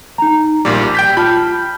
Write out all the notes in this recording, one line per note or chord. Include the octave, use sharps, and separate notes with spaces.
D#4 A#5
A#1 A#2 G3 D6
G5 G6 B6
F4 A5 B5 F6 G6